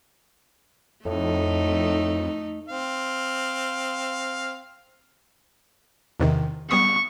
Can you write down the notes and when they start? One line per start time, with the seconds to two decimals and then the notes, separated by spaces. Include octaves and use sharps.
1.05 F2 A2 A3 D#4
2.68 C4 F5
6.20 E2 C3 D#3
6.71 G3 B3 C#6 D#6